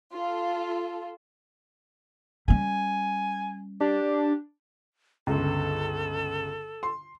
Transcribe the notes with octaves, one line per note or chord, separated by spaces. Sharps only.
F4 A4
G3 C#4 G#5
D4 G4
G1 C#2 A4
C6